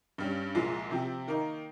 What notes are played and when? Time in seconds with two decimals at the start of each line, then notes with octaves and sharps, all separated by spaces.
0.18 G2 G3 C#4
0.55 C2 A#2 F3 G#3
0.91 C3 F3 C4 G4
1.28 D#3 A#3 D#4